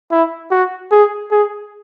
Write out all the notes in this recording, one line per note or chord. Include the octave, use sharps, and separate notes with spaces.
E4
F#4
G#4
G#4